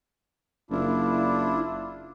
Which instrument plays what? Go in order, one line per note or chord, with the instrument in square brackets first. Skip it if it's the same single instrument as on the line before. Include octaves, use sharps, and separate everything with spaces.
[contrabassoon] F#1 [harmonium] D4 E4 F4